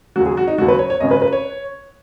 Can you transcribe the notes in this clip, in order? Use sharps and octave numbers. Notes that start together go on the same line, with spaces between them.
D#2 C#3 F#3 F#4
G#4
F#4
D#4
D#2 C#3 F#3 F#4
B4
C#5
C#5
G#1 F#2 C#3 D#5
B4
B4
C#5